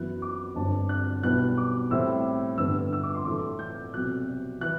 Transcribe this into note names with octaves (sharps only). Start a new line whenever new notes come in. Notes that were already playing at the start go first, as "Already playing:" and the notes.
Already playing: F#2 E3 B3 E4 F#6
D6
G1 G2 D3 G3 C4 A5
F#6
B1 B2 G3 B3 E4 F#6
D6
A2 G3 C4 E4 E6
G2 D3 G3 B3 E6
E6
D6
C6
A2 E3 A3 D6
G6
C2 B2 F#3 F#6
E3 F#6